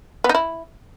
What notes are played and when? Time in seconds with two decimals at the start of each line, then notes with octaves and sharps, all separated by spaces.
0.24 B3
0.29 D#4
0.35 E4